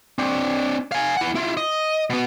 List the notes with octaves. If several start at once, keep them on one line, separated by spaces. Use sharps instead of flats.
C4 D4
F5 G#5
E4 F#5
E4 F4
D#5
B2 B3